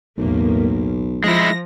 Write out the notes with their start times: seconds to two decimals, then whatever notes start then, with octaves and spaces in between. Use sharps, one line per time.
0.18 B1 E2 A2 A#3
1.24 F3 G#3 E4 A#6